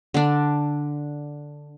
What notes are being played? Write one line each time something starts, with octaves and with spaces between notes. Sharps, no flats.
D3 D4